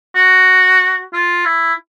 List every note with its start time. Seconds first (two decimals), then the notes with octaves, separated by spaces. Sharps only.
0.15 F#4
1.13 F4
1.45 E4